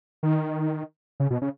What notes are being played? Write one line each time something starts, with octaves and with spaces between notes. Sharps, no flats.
D#3
C#3
B2
C#3